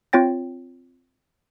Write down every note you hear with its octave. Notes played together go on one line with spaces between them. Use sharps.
C4 F4 C#5 G5 A6 A#6